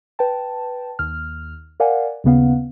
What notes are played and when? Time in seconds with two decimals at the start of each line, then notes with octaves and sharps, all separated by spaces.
0.19 B4 G5 A5
0.99 D#2 F6
1.80 A#4 D5 F5 F#5 G#5
2.24 D#2 C#3 B3 F5 F#5